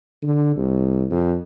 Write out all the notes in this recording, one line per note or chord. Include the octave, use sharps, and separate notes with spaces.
D3
C2
F2